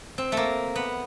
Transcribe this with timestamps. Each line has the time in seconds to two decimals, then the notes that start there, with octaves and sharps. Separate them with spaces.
0.18 C4
0.32 A3 A#3
0.76 B3